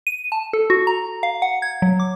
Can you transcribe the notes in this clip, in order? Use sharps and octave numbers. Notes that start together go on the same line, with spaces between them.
D#7
A5
A4
F#4
A#5
F5
F#5
G#6
F#3
D6